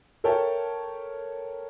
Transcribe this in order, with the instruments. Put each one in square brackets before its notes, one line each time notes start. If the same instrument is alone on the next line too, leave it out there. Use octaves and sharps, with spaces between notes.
[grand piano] A4 A#4 C#5 E5 G5 A5